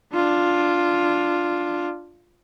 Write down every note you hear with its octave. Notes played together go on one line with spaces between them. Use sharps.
D4 F4